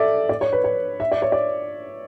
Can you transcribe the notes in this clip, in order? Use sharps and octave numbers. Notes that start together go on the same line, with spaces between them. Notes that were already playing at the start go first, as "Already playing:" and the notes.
Already playing: A4 D5 E5
D5
C#5
B4
C#5
E5
D5
C#5
D5